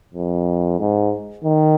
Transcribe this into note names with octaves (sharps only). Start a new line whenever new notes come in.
F2
G#2
D#3